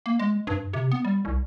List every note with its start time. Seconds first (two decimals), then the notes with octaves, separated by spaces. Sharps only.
0.06 A#3
0.19 G#3
0.47 G2
0.73 C3
0.92 B3
1.05 G3
1.25 C2